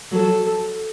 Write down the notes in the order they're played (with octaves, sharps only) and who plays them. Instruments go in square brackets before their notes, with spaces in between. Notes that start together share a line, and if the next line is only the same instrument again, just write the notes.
[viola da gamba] F#3 [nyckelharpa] A4